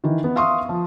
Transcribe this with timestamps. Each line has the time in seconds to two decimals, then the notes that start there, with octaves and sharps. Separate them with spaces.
0.04 D#3 E3
0.24 B3
0.36 E5 F5 C6 C#6 D#6
0.69 F3